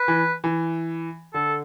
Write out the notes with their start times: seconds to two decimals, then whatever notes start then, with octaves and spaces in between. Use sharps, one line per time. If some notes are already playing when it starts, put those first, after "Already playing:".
Already playing: B4
0.08 E3
0.44 E3
1.34 D3 A4